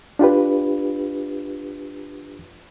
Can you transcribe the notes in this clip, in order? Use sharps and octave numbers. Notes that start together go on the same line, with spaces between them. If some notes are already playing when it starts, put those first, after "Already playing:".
D4 F4 G4 B4